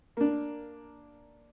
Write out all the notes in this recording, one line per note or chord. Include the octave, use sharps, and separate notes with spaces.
A#3 D4